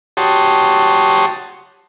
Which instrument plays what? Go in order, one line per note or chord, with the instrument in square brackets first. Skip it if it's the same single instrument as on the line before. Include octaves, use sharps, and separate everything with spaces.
[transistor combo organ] F#4 G4 C#5 A5 C6 D#6